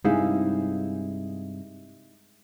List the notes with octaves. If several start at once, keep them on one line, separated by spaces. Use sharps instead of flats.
G2 C3 G#3 D#4 E4 G#4 F5